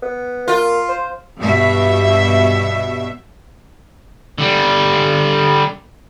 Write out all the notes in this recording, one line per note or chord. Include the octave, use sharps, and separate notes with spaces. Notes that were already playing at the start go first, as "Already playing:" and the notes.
B3
A#3 F4
C5
G2 B2 E5
D3 G3